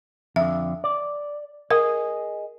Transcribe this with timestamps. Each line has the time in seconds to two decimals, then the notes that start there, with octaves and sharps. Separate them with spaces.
0.36 F2 D3 E5
0.84 D5
1.70 G#4 A#4 D#5